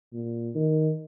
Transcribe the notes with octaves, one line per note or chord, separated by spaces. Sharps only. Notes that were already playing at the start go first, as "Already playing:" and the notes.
A#2
D#3